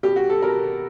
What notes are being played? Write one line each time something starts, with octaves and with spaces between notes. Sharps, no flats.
B2 G4
F#4
A4
B2 A#4